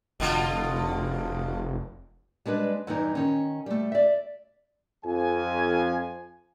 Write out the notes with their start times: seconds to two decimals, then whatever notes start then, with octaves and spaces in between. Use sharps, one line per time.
0.20 F1 B2 D3 F4
2.46 G3 G#3 D4 B4
2.87 E2 G2 E3 D#4
3.15 D#3 C#4
3.66 G3 A3
3.92 D5 E5
5.04 F2 F3 G#5